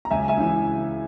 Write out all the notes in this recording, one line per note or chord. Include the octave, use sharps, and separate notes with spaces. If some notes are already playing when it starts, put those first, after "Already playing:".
A#5
C#2 E5 G#5
E5 G#5
C#3 E3